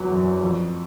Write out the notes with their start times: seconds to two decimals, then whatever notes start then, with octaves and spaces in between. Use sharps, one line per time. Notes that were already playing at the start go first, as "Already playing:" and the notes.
Already playing: E2 F#3
0.12 F#2
0.42 F2